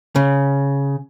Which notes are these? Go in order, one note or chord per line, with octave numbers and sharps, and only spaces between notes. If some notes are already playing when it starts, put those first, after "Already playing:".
C#3